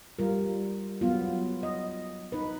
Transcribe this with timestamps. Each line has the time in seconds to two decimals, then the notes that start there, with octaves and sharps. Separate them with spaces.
0.19 G3 F4 A#4
1.01 F#3 B3 F4
1.63 D#5
2.32 D#4 B4